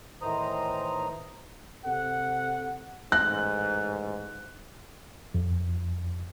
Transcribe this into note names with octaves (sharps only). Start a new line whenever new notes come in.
A2 D#3 E3 C5 A#5 D#6
C3 A4 F#5
A1 G#2 F#6
F2